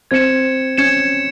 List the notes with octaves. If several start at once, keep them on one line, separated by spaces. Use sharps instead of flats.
C4 G#6 C#7 E7
C#4 G#6 C#7 E7